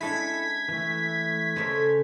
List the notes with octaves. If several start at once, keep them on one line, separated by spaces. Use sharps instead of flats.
G#3 C#4 D4 E4 A4 G#6 B6
E3 A3
C#3 G#3 A4 A#4 C5 C#5